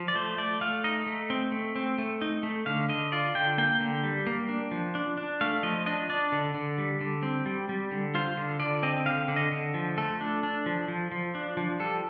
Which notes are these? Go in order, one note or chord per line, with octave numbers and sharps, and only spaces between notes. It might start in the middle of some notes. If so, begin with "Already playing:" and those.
Already playing: F3
D5
A3 C5
A3 D5
A3 F5
D#4 D#5
A3
C4
A3
C4
A3
D#4
A3
D3 F5
D3 D#5
F4 D5
D3 G5
A#3 G5
D3
G3
A#3
D4
F3
D4
D4
A3 F5
F3 D#5
D4 D#5
D4 D5
D3
D3
G3
D3
C4
G3
G3
D3
F4 C5
D3
D3 D5
C4 D#5
D3 F5
D3
D#5
D3
F3
A3 A4
D4
D4
F3
F3
F3
D4
F3
G3 A4